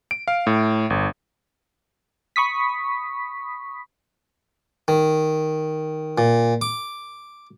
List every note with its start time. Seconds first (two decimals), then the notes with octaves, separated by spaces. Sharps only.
0.11 D7
0.28 F5
0.47 A2
0.90 G1
2.36 B5 C#6 D#6 B6
4.88 D#3
6.18 A#2
6.61 D6